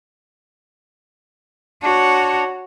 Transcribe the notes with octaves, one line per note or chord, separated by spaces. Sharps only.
D4 F#4 C#5